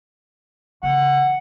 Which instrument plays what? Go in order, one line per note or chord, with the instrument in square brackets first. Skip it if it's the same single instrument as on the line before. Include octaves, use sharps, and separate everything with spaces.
[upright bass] C#3 E3 [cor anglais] F#5